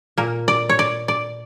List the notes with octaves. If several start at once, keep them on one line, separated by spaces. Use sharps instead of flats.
A#2 A#3
D5
C#5
D5
D5